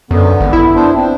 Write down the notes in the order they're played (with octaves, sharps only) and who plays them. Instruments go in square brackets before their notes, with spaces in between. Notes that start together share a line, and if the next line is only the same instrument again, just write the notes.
[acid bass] F#2 [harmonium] D3 B3
[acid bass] G#1
E4
[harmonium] B3 D4 C5
C4 D4